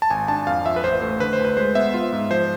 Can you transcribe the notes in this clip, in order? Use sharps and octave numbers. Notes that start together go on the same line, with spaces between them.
A5
G#1 G#5
D4 A5
F2 F5
F3 E5
B4
A1 C5
A3 C5
D3 B4
C5
D2
B4
G#3 C5
B3 E5
F4
G#2
F3 C5